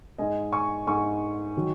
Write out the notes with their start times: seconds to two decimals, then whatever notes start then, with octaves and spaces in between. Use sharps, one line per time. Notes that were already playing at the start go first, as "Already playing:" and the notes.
0.18 G#2 G#3 D#5 G#5
0.52 G#5 C#6
0.87 G#2 G#3 G#5 C#6
1.57 D#3 F#3